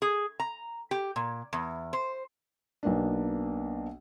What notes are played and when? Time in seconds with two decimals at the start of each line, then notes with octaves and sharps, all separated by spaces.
0.02 G#4
0.40 A#5
0.91 G4
1.16 A#2
1.53 E2
1.93 C5
2.83 B1 A#3 B3 D4